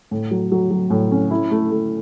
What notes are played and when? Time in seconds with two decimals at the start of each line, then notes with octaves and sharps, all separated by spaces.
0.11 A2
0.31 F#3
0.52 F#3
0.71 F#3
0.90 A2
1.11 C#4
1.31 E4
1.50 A3
1.70 A3